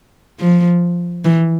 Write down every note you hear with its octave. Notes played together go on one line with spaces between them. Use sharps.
F3
E3